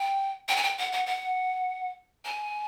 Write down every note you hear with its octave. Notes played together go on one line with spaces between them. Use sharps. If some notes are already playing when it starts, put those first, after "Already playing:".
Already playing: G5
G5
G#5
G5
F#5
F#5
F#5
G#5